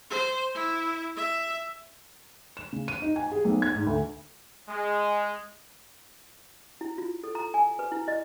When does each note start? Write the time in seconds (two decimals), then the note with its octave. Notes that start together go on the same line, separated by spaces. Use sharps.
0.10 C5
0.55 E4
1.17 E5
2.57 E7
2.73 C#3
2.88 D#7
3.02 D#4
3.16 G#5
3.32 G#4
3.45 B1
3.62 G#6
3.75 G#2
3.87 D2
4.69 G#3
6.81 E4
6.98 F4
7.24 A4
7.35 A#5
7.54 G#5
7.79 B4
7.92 E4
8.08 D#5